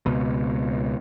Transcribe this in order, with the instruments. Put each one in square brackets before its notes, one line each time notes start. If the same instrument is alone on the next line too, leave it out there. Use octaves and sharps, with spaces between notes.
[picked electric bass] C#2 B2